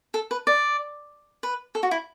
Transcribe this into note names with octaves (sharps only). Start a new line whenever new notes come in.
A4
B4
D5
B4
A4
F#4
E4